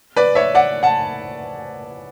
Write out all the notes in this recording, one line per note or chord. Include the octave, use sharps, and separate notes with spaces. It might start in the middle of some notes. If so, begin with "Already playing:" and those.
B4 D5
C#5 E5
D5 F#5
F#5 A5